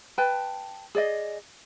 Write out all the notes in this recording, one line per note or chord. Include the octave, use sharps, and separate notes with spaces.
B4 G5 A5
G#4 D5 D#5